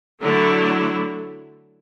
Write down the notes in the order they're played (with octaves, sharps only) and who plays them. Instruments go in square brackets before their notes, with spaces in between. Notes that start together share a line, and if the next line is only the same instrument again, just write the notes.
[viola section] D3 F#3 A3 E4